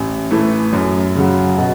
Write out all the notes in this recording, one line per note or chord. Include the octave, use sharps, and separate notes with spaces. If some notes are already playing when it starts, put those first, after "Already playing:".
Already playing: A1
A2 E3 A3
F#2
C#3 F#3
B2